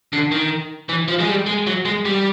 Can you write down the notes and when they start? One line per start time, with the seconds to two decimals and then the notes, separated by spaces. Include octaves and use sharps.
0.13 D3
0.32 D#3
0.89 E3
1.08 F3
1.20 G#3
1.29 G3
1.47 G#3
1.67 F#3
1.85 G#3
2.05 G3